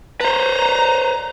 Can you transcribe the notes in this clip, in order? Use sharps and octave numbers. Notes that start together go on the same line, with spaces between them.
B4 C5 A#5